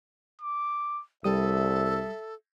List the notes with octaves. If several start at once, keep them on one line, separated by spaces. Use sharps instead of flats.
D6
C2 G3 A4 E5 D#6